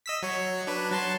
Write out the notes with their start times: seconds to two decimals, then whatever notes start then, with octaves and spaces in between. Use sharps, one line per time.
0.06 D#5 E6 B6
0.22 F#3 C#5
0.67 D4 B4
0.91 F#3 A5 C6